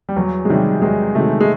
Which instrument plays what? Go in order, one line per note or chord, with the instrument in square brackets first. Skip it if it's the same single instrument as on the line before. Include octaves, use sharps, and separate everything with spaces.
[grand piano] G3
[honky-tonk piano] E2 [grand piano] F#3
[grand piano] G#3
[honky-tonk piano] C3 D#3 F#3 [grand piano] G3
[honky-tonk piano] E2 [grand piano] G#3
[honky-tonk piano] C3 D#3 F#3 [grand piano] A3
[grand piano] G#3